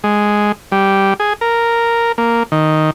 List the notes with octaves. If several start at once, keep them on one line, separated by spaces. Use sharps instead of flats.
G#3
G3
G#4
A#4
A#3
D#3